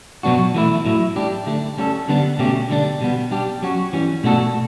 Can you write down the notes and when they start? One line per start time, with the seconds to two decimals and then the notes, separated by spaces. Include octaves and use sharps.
0.23 B2 F#3 B3 D4 F#4
0.54 E3 A3 E4
0.85 A2 F#3 A3 E4
1.16 G3 D4 G4
1.46 D3 A3 D4
1.78 G3 C#4 F#4 A4
2.09 D3 G3 B3 D4
2.39 B2 A3 C#4 G4
2.70 D3 G3 D4
3.01 B2 G3 B3
3.31 G3 D4 G4
3.62 F#3 C#4 F#4
3.93 E3 G3 C#4
4.24 B2 A3 D4 F#4 A4